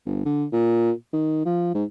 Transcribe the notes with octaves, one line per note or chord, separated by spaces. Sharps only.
G1
D3
A#2
D#3
F3
G#2